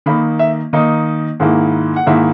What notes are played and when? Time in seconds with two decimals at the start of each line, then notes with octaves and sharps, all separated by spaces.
0.06 D#3 A#3 D#4 B5
0.39 E5
0.73 D#3 A#3 D#4 D#5
1.40 G#2 D#3 A#3 E4
1.96 F#5
2.06 G#2 D#3 A#3 E4 E5